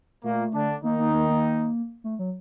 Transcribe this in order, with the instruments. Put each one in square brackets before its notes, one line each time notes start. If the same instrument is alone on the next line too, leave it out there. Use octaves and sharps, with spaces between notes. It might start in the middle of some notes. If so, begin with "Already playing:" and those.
[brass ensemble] A#2 A#3 [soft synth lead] A3
[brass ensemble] D3 D4
[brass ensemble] D#3 D#4 [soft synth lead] A#3
[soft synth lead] A#3
A#3
A#3
A3
F#3